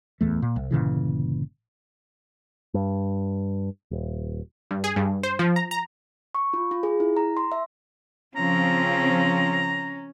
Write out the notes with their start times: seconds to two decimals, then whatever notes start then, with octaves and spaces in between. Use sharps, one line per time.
0.21 D1 E2 A3
0.42 A#2
0.56 C2
0.71 G1 A#2 C#3 E3
2.74 G2
3.91 D#1
4.71 G2
4.84 G#4
4.96 G2
5.23 C5
5.39 F3
5.56 A#5
5.71 A#5
6.35 C#6
6.53 F4
6.71 F4
6.83 G#4
7.00 E4
7.17 A#5
7.37 C6
7.52 E5
8.36 C#3 F3 C4 C#4 A#5